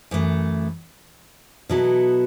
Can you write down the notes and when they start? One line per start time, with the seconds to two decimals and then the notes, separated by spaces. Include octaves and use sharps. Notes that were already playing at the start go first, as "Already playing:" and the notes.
0.11 F#2 E3 A3
1.69 B2 F#3 B3 E4 A4